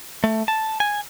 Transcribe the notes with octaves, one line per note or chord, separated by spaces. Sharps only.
A3
A5
G#5